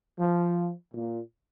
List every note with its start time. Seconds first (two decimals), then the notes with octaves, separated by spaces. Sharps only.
0.18 F3
0.93 A#2